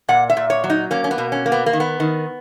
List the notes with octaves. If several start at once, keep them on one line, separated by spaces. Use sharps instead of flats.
A#2 F#5
E5
A#2
C#5
F#3
D#4
A#3 C#4
C#4
B3
B2
C#4
A#3
B3
A#3
D#3
B3
D#3